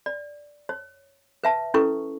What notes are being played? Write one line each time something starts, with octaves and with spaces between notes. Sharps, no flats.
D5
C#5
B4 E5 A5
C#4 E4 A4 B4 C#6